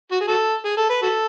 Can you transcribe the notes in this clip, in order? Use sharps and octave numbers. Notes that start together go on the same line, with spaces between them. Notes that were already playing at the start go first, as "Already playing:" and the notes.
F#4
G#4
F#4 A4
G#4
A4
B4
F#4 A4